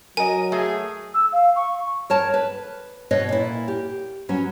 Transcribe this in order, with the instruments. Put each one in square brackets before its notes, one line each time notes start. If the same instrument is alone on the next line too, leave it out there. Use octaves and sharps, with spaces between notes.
[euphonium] F#3 [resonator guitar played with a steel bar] A#4 D#5 [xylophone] G#5
[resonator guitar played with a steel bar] A3 [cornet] G#4
[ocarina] E6
F5
C#6
[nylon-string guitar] A#4 C#5 A5
B4
B2 B4 C#5 D#5
A#2 E4
G4
F#3 C#4 B4